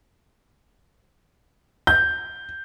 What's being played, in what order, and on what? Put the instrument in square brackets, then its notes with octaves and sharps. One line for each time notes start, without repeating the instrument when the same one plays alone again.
[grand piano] G6